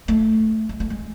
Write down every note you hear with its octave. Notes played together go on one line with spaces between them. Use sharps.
A3
G#3
A3
G#3